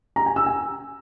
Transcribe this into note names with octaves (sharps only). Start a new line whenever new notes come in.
A#5
G#5
E6
G#5